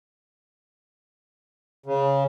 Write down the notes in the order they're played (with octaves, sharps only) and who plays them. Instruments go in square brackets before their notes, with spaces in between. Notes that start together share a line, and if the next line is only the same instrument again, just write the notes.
[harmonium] C#3